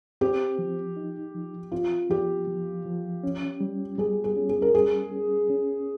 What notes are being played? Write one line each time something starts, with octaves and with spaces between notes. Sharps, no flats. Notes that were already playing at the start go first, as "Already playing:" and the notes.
C4 G4
F3
D#4
F3
C4 F4
F3 G4
F3
F3
C#4
G3
G3 G#4
G#4
C#4
G#4
A#4
G3 G#4
C#4
C#4